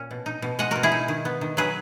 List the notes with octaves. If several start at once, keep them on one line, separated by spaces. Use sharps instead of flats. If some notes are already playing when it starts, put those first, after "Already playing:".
Already playing: A#2 C#4
B2
D#4
B2
G#3 D#5 F#5
B2 F#4 A#4
E4 G#4
D#4
D#3
B3
D#3
F#3 G#4 B4